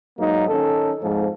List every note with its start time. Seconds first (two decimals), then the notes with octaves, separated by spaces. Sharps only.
0.18 G#2 F#3 A#3 D#4
0.48 D#3 C#4 A4
1.01 F2 G#2 F3